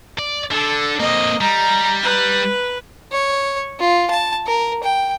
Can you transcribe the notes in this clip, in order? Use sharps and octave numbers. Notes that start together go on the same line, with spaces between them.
D5
D3 A4
A#3 C4 D#5
G3 A#5
B4
C#5
F4
A5
A#4
G5